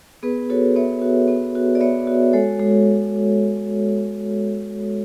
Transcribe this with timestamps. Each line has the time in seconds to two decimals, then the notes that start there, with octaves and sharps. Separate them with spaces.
0.23 B3 G#4 B4
0.50 F#4 A4 C#5
0.76 B3 C#5 E5
1.02 F#4
1.28 B3
1.55 F#4
1.75 D5
1.81 B3 C#5 E5
2.07 F#4
2.33 G#3 A4 C#5
2.59 G#3